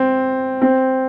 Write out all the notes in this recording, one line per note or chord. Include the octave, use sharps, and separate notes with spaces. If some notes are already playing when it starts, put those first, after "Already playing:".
Already playing: C4
C4